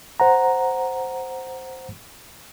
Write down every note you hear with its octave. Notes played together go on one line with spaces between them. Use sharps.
C5 F#5 A#5